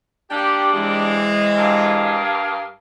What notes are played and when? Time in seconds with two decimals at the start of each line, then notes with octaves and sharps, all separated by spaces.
0.30 G3 A#3 D4 G4
0.73 E3 G#3 C4
1.56 G2 A#4 F5